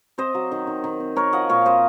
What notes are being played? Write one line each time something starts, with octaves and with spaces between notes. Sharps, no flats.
C4 C5 D#5
F#3
D#3
D#3
D#3
C4
C4 A#4 C#5
F3 D#5 F#5
A#2 C#5 F5
C4 C5 D#5